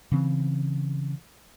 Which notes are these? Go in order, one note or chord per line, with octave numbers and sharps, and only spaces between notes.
C#3 E3 C4